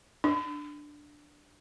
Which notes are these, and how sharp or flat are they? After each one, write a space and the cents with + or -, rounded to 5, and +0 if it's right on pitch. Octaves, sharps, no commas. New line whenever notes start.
D4 +5